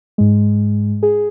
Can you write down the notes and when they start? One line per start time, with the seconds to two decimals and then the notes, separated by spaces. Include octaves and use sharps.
0.18 G#2 G#3
1.03 G#4